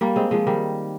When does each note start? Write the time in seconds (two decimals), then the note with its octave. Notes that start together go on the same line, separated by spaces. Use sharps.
0.01 G3 A#3
0.16 G#3 C4
0.31 F3 G#3
0.47 D#3 G3